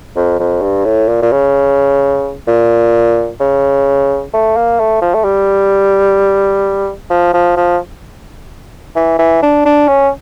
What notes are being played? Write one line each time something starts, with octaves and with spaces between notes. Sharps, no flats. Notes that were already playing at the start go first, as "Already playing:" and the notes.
F2
F2
G2
A2
A#2
A#2
C#3
A#2
C#3
A3
A#3
A3
F3
A3
G3
F3
F3
F3
E3
E3
D4
D4
C#4